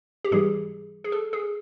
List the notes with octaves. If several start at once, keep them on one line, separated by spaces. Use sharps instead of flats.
G4
G#2 E3 G3 G#4
G#4
A4
G#4